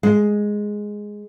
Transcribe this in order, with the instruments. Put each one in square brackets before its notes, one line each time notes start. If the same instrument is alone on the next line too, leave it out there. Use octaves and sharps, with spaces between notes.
[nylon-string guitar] G#3